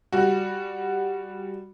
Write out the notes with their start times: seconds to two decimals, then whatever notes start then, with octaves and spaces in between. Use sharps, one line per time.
0.12 G3 F#4